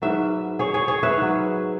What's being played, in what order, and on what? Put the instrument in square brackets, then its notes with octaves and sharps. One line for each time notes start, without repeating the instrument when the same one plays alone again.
[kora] G#2 F#3 B4 E5
G#4 C#5
G#4 C#5
G#4 C#5
B4 E5
G#2 F#3